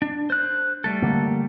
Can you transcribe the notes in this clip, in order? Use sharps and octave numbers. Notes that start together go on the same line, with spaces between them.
D4
C5 F#6
G3 A3 A4
D3 A#3